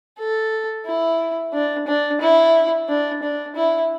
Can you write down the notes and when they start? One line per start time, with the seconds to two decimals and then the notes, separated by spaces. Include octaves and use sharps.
0.19 A4
0.86 E4
1.53 D4
1.87 D4
2.21 E4
2.88 D4
3.22 D4
3.56 E4